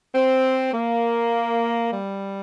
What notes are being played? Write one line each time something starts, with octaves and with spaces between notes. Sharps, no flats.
C4
A#3
G3